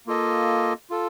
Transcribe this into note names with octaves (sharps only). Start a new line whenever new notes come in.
A#3 F4 A4 D#5
F4 A4